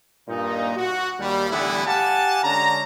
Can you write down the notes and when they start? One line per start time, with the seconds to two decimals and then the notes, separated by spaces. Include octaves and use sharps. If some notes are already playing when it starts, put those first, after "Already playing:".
0.28 G2 A#2 D#4
0.76 F#4
1.19 D#2 G3
1.50 A2 D3 E3 G3 B3 E4
1.86 G4 F5 F#5 G#5 A5
2.44 D3 G#3 C#4 A#5